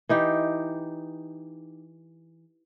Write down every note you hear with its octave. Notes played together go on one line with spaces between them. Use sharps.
E3 D#4 G4